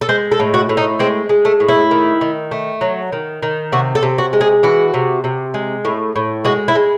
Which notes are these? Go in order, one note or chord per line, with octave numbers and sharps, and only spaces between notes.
A4
G#3 C5
A4
A2
F#4
A2
D#4
G#3 C4
G#3
A3
A2
E4
D#3
D#3
A3
F#3
D#3
D#3
C3 F#4
A4
C3
F#4
G#3
G#4
E3 F#4
C3
C3
G#3
A2
A2
G#3 F#4
E4
G#3